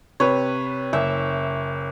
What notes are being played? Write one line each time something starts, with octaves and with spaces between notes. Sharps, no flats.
C3 B4 C#5
F#1 E5